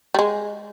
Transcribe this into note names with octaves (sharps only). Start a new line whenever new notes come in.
G3
G#3